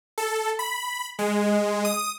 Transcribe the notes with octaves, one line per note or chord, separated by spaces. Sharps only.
A4
B5
G#3
D#6